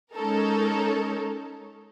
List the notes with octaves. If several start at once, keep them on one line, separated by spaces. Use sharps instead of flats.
G#3 C#4 D#4 A4 A#4